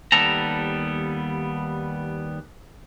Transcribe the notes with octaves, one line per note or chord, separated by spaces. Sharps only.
D#2 G3 B3 A4 A5 A#5